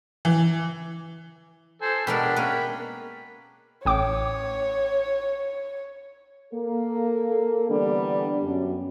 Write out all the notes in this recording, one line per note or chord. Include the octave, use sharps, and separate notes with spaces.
E3
A4 C5 G#5
B2 G#3 D4 A#4 G5 B5
A#3 C#4 B4
A1 C#5 G5 D6
A#3 A4
D3 E3 G3 B3 D4
F#2